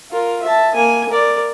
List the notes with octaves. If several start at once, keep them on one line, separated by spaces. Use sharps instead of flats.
F4 A#4
E5 A5
A#3 G#5
A#4 D5